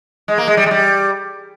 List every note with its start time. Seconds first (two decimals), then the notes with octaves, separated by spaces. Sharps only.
0.28 G#3
0.38 A#3
0.47 G#3
0.57 G3
0.66 G#3
0.71 G3